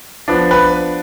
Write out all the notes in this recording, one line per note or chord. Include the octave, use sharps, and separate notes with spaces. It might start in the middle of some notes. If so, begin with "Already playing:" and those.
F3 B3 D4
B4